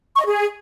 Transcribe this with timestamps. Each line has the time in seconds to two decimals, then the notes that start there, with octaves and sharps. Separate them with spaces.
0.15 C#6
0.21 D#5
0.26 G#4